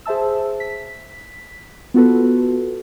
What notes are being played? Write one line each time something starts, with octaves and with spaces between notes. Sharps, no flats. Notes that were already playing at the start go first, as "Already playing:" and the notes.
G#4 C5 E5 A5 E6
B6
B3 F4 F#4 A4 B4